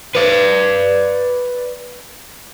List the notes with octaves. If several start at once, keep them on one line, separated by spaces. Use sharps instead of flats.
B4 D5